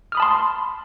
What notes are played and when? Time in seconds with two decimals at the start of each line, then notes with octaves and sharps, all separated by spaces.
0.12 F6
0.15 D#6
0.17 B5
0.20 A5
0.22 C6